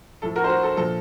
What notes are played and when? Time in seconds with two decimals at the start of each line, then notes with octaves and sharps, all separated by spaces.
0.22 A2 F3 A4
0.35 F#4 A#4
0.44 C5
0.49 F#4 A#4
0.63 A4
0.77 A#2 F3 A4